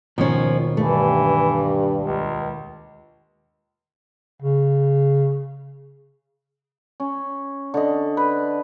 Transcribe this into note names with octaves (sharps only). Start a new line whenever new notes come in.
D#2 B2 D#3 F3 C#4
G2 E3 A3
C#2
C#3
C#4
D3 D#5
B4